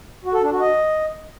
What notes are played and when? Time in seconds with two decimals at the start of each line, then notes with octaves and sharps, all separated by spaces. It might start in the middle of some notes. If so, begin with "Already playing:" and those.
0.25 F#4
0.34 A4
0.42 D4
0.51 F#4
0.60 D#5